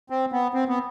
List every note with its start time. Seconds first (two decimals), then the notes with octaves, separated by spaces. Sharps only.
0.10 C4
0.32 B3
0.54 C4
0.68 B3